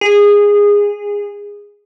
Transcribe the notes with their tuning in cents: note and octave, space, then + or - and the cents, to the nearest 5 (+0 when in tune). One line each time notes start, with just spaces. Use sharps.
G#4 -15